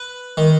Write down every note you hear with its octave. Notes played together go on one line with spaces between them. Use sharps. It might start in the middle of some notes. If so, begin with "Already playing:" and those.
Already playing: B4
D#3